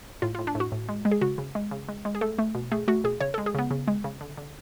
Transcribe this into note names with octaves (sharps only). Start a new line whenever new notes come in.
A2 F4
F4
A2
D4
A2
F#4
A2
G#3
G#3
G#4
C#3 F#4
C#3
G#3
C#3
G#3
G#3
G#4
A3 A4
A3
B2
A3 G#4
A3 F#4
B2 G#4
C#3 C#5
A4
G#3
G#4
C#3 B3
C#3
G#3
C#3
D3
D3